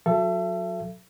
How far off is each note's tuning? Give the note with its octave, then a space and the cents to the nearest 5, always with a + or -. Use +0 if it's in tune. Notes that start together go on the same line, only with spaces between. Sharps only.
F#3 -30 A4 +0 E5 +35